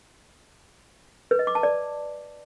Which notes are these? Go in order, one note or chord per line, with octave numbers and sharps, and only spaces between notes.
B4
D#5
D6
A5
D5